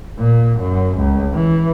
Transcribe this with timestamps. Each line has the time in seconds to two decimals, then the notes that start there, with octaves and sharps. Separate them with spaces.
0.19 A#2
0.60 F#2
0.98 C#2
1.33 E3